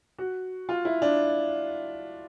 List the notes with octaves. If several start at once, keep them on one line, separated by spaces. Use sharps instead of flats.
F#4
F4
E4
D4